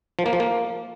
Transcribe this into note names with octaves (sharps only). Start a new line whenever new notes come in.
F3
A#3
F3
A#3